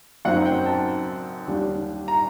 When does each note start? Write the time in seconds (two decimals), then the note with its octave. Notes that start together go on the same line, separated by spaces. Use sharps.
0.25 F#2 F#3 C4 D#4 F#5
0.46 G5
0.66 A5
1.47 D#2 D3 G3 D4
2.08 A#5